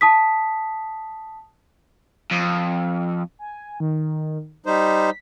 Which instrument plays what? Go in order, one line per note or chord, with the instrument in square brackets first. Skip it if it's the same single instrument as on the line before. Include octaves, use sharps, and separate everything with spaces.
[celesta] A5 D#6 B6
[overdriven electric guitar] F2
[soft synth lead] G#5
D#3
[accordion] G3 D#4 C5 [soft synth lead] B6